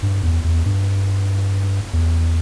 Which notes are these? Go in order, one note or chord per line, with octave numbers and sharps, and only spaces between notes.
G2
E2
E2
G2
E2